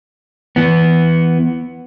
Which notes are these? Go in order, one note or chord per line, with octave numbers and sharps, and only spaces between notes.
E3 B3